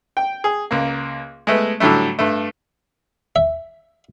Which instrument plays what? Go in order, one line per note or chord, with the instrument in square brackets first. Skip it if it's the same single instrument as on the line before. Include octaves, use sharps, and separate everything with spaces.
[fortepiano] G5
G#4
C#2 A#3
G#3 A3 B3
A2 D3 F#3 G3 A3
G2 A3
[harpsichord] E5